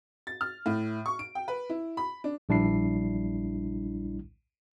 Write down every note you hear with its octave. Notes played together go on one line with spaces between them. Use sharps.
A6
F6
A2
C#6
D7
G5
B4
E4
B5
D4
A#1 G3 D4 E4 C7